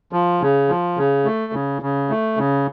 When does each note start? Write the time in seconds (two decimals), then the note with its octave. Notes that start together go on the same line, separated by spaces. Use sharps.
0.13 F3
0.42 C#3
0.69 F3
0.98 C#3
1.25 A3
1.53 C#3
1.82 C#3
2.09 A3
2.37 C#3